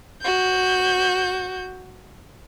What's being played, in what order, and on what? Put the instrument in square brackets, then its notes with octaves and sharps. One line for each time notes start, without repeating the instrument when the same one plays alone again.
[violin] F#4 G6